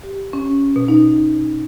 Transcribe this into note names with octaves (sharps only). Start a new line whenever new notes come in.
G4
C#4
B2
D#4